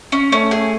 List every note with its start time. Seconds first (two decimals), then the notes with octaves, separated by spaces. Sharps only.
0.12 C#4
0.32 A3 C#4
0.51 G#4